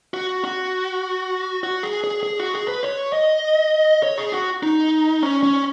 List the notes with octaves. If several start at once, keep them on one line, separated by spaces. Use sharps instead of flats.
F#4
F#4
F#4
G#4
G#4
G#4
F#4
G#4
B4
C#5
D#5
C#5
G#4
F#4
D#4
C#4
C#4